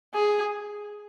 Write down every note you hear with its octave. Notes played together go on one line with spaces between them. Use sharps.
G#4